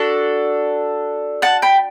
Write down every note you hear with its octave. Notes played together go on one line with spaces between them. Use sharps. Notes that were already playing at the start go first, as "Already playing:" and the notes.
Already playing: D4 F#4 A4
F#5 A5
G5 B5